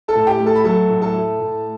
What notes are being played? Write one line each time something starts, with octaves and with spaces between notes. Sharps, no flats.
A4 A5
A2
G4 G5
A3
A4 A5
B5
F#3 A4 A5
A2
A4 A5
A3
A2